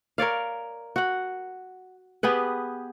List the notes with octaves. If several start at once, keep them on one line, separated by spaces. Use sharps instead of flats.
A#4 C#5 D5 F5
F#4 F#5
B3 G4 G#4 B4